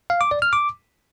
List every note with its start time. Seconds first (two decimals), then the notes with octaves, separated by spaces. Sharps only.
0.10 F5
0.21 D6
0.31 D5
0.42 F6
0.53 D6